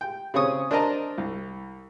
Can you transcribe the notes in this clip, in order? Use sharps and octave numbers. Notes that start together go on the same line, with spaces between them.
G5
C#3 C4 C#5 C#6 D#6
D4 A#4 C5 D#5 A5 A#5
C2